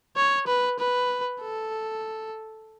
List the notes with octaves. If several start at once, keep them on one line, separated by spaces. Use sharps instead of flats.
C#5
B4
B4
A4